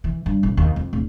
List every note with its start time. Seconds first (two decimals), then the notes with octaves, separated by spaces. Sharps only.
0.04 E3
0.26 G2
0.43 A1
0.57 D#2
0.76 F2
0.93 D1